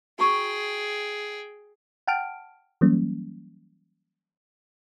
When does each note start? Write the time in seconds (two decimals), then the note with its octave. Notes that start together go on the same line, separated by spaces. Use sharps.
0.19 F#4 G#4 G5 A#5 C#6
2.07 F#5 G5 A5 F6 D7
2.81 E3 F#3 G3 A#3 C#4